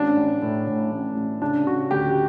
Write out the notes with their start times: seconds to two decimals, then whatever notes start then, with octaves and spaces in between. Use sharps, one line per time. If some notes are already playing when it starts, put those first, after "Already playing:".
Already playing: A1 D4
0.17 A1
0.42 A2
0.67 A2
0.92 A1
1.16 A1
1.41 C#3 D4
1.66 C#3 F#4
1.91 D2 G4